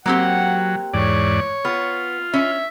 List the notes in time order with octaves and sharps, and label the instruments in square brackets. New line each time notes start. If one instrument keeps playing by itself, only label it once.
[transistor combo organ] F#3 [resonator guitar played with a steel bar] A#3 C4 G4 [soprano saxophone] F#5
[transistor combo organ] E2 G#2 D5 [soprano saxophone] C#5
[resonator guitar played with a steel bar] B3 [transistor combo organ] F4
[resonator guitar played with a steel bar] C#4 [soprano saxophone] E5